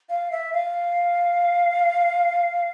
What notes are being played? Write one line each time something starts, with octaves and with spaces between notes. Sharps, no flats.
F5
E5
F5